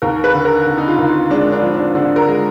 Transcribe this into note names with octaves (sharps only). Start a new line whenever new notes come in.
D#2 A#4
B4
D3
A#4
D3
D#4
F4
D#2
F4
G#3 D4
D4
F3
D4
D3 D4
A#4
G#3